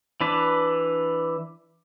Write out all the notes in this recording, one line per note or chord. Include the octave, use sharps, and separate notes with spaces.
E3 D4 B4